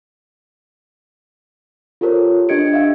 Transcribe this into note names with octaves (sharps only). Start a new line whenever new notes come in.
F4 G4 A4 A#4 C5 C#5
D4 G4 D#5 G#6 C#7 D7
E5 F5